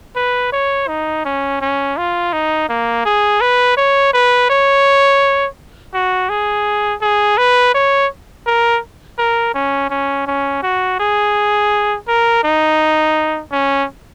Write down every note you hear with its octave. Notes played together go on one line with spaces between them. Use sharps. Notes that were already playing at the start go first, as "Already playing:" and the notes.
B4
C#5
D#4
C#4
C#4
F4
D#4
A#3
G#4
B4
C#5
B4
C#5
F#4
G#4
G#4
B4
C#5
A#4
A#4
C#4
C#4
C#4
F#4
G#4
A#4
D#4
C#4